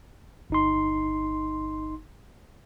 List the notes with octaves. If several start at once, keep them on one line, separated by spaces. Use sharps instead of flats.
G1 D#4 C6